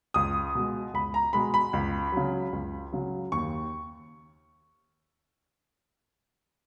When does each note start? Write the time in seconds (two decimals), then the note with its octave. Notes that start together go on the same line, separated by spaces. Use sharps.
0.14 C#2 D#6
0.55 B2 G#3
0.93 C#2 B5
1.14 A#5
1.33 B2 G#3 B5
1.54 B5
1.73 C#2
2.12 C#3 F#3
2.53 C#2
2.92 C#3 F#3
3.32 D#2 C#6